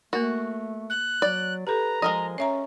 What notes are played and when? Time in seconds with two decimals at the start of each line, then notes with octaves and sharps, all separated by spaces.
0.13 A3 A#3 F#4 A#4
0.90 F#6
1.22 F#3 D5
1.67 G4 A4 B4 A#5
2.02 F3 G#3 A#4 D#5
2.38 C#4 C#5 E5 A#5